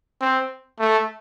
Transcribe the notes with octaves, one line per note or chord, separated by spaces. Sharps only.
C4
A3